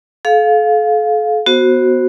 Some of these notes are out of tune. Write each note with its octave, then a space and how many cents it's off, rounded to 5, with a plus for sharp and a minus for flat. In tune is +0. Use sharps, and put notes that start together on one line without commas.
A4 -40 F5 +10
B3 +5 F#4 +0 C5 +15